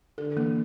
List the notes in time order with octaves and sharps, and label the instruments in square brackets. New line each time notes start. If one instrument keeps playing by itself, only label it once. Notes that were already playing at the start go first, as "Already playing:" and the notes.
[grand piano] D3 [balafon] A4
[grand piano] E3 [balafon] A#3